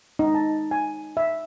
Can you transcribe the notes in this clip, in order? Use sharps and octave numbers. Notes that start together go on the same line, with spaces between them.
D#4
A5
G#5
E5